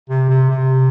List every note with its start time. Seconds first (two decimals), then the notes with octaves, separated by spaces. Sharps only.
0.10 C3
0.29 C3
0.50 C3